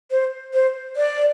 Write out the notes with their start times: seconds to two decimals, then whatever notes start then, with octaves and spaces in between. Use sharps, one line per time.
0.11 C5
0.53 C5
0.96 D5